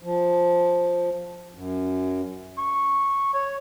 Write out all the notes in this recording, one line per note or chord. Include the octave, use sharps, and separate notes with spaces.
F3
F#2
C#6
C#5